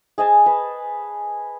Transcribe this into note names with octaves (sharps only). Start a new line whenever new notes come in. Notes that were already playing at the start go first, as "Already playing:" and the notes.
G#4 D#5 G#5 A5
B4